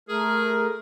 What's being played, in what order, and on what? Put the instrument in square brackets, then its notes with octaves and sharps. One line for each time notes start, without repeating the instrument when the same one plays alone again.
[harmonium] A3 A#4 [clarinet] G#4